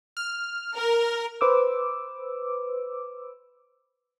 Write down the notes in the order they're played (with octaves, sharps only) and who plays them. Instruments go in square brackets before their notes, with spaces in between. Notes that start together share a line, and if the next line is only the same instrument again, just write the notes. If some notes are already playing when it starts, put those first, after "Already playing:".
[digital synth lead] F6
[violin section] A#4
[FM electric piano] B4 C5 D6 E6